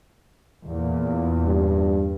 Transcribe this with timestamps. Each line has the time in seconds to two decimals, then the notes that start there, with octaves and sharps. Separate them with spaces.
0.64 E2 A#2
1.45 G2